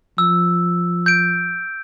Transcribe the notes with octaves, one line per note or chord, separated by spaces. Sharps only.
F3 E6
G6 D7